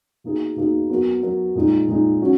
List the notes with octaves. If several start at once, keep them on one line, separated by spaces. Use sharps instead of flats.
B2 A#3 D#4 G#4
B2 A#3 D#4 G#4
F#3 B3 F#4 A#4
F#3 B3 F#4 A#4
A#2 G#3 D#4
A#2 G#3 D#4
F#3 C#4 F#4